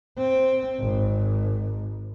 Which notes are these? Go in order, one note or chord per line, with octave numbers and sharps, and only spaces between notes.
C4
G#1